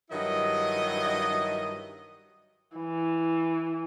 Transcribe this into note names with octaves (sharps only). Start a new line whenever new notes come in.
G2 D#3 F#3 E4 D#5
E3